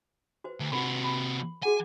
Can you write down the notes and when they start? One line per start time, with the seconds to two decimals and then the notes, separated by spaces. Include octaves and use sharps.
0.44 F#4 B4 C5
0.60 D2
0.72 C3 F#4 A#4 B5 C6
1.04 B5
1.63 F#4 G#4 F#5 G#5